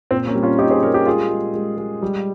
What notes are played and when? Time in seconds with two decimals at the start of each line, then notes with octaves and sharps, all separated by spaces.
0.11 A#2 C4
0.27 A#3 C#4
0.35 G3
0.43 C#4 F4
0.58 A#2 D#4 G4
0.71 G#4 C5
0.83 G3 A#4 C#5
0.94 G4 A#4
1.06 G#3 F4 G#4
1.31 G#3
1.55 G#3
1.78 G#3
2.02 G3